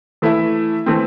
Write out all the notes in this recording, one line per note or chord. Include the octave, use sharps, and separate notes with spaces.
E3 A3 E4 A4 E5
E3 A3 C4